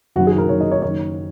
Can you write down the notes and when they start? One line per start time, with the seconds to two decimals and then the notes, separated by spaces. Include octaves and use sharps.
0.16 F#1 F#2 D#3 F#4
0.27 G#4
0.38 A#4
0.49 F#1 F#2 D#3 C#5
0.61 D#5
0.72 C#5
0.82 F#1 F#2 D#3 C#5